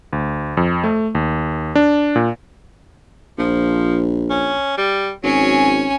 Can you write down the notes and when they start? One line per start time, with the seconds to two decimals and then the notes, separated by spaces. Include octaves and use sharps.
0.13 D2
0.57 F2
0.84 A3
1.15 D#2
1.75 D4
2.16 A#2
3.39 A#1 F3
4.30 C#4
4.78 G3
5.24 G#1 F#3 C#4 G#5